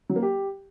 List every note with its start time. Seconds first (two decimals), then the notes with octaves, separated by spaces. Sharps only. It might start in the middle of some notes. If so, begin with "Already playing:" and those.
0.09 F#3
0.16 A#3
0.23 G4